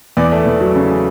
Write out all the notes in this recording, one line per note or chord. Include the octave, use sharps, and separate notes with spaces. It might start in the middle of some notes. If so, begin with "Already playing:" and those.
E2 D5
A3
E2
F#3
C#3